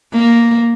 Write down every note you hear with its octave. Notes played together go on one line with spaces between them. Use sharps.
A#3